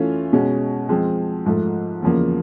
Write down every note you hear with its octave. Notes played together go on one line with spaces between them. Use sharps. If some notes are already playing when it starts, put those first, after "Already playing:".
Already playing: E3 A3 C#4 F4
B2 G#3 C#4
F3 G#3 C4
G#2 F3 A3
E2 C#3 F3 A#3